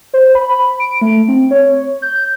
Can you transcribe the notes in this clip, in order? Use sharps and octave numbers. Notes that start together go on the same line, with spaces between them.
C5
B5
B5
D7
A3
C4
C#5
G6